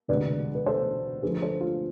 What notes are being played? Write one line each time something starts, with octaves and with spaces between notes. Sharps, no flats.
E1 D2 C3 G#3 B4 D5
B4
A4 C5
D2 D3 F3 A3 G#4 B4
A4 C5
F4